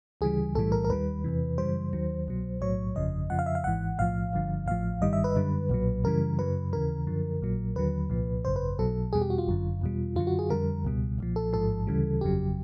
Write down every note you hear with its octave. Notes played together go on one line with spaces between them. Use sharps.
D2 C#3 E3 G3 G#4
B1 A2 E3 G3 A4
A#4
A#4
D#2 D#3 G3 B4
E2 C3 E3
F#2 C#3 E3 G3 C5
D#2 D#3 F#3
C2 B2 F#3
B1 A2 F#3 C#5
G1 F2 C#3 F3 D#5
F2 C#3 F3 F#5
F5
E5
F5
G#1 G#2 E3 F#5
B1 A2 F3 F5
G1 G2 D3 F3
A1 A2 F3 F5
G1 G2 D#3 G3 D#5
E5
B4
F#2 D3 G3
B1 A#2 F#3
F#2 C#3 E3 G3 A#4
F#2 C#3 F#3 B4
D#2 C#3 E3 A#4
F#2 D3 F3
A#1 A#2 F#3
D#2 D3 F#3 B4
C2 A#2 F3
G#1 F#2 C#3 C5
B4
B1 B2 F#3 A4
E2 B2 G3 G#4
G4
F#4
F4
G1 F#2 D3
E2 B2 G3
F#2 D3 F#3 F4
F#4
G#4
F2 D3 G3 A#4
C#2 B2 G3
B1 A#2 F3
A4
A1 G#2 F3 A4
D2 C#3 E3 G3
G1 F2 C#3 F#3 G4